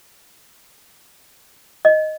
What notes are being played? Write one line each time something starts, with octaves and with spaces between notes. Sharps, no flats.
D#5